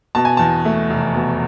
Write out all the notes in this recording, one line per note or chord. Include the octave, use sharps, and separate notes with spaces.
B2 A5
G#5
E2 A5
A3
F1
B2